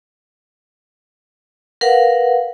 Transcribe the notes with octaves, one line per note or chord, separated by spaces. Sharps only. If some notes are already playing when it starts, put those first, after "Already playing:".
A#4 B4 F5 F#5